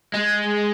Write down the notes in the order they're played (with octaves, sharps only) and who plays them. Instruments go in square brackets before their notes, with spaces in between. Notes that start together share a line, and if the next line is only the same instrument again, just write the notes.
[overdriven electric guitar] G#3